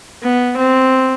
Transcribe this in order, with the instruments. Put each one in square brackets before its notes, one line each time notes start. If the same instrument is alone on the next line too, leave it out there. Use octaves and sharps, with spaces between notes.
[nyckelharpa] B3
C4